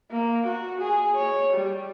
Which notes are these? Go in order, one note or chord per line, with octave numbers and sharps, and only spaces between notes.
A#3
F#4
G#4
C#5
G3